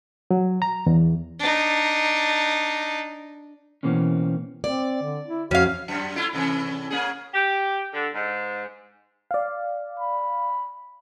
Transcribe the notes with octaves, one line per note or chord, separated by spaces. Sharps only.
F#3
A#5
E2
D4 D#4
B2 E3 A#3 C4 C#4
C4 D5
D3
E4
F2 C#4 F#4 F5
F#2
A3 E4 F4
A2 C3 E3
A#3 C#4 G#4
G4
D3
G#2
D5 F5
B5